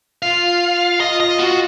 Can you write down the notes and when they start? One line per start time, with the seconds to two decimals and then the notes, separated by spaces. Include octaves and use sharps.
0.22 F4 F5
1.00 D#5
1.20 D#5
1.39 F#4